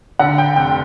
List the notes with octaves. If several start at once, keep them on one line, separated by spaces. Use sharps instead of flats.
D3 F#5
G5
F1 G5